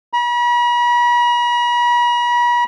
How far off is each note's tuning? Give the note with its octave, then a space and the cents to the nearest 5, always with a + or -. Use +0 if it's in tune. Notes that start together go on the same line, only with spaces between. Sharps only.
B5 -45